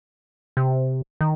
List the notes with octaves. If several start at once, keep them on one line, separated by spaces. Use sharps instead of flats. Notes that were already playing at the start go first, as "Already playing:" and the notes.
C3
D#3